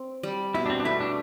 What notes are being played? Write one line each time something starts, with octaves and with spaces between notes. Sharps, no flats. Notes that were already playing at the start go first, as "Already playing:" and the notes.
Already playing: C4
G3
B2 E4
D4
C4
D4
A3 E4
D4